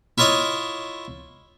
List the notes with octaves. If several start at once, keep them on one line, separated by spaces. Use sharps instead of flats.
E4 F4 C#5 D#5 D#6